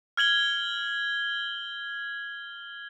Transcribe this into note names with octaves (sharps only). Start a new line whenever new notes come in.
F6 G#6 F#7 G7